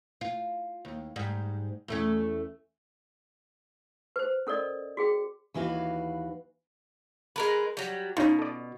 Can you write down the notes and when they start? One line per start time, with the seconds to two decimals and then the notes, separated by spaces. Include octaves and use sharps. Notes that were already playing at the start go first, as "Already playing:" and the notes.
0.21 F4
0.85 D#2
1.16 G#2 G3
1.88 E2 A3 C#4
4.16 B4 C5
4.47 C#4 A4 A#4 D5 D#5
4.97 F#4 G#4 G5
5.54 D#2 E3 F#4 B4 F5
7.36 G#3 A#4 B4
7.77 F#3 G3
8.17 B2 C#4 D#4 F4
8.39 A4 D5